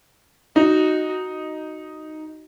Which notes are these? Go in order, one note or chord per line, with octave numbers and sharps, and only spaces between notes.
D#4 F#4